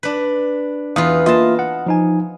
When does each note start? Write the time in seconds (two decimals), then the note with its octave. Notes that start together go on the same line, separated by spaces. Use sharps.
0.03 D4 B4
0.96 E2 B3 F4 F5 D#6
1.26 A#3 F4 D#5 E5 A5
1.59 F#5
1.86 F3 D#4 G#5